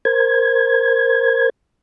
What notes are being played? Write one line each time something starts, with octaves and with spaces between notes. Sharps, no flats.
A#4 C5 G#6